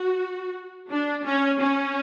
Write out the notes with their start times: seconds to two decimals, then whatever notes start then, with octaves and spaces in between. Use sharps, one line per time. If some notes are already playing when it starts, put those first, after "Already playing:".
Already playing: F#4
0.90 D4
1.25 C#4
1.60 C#4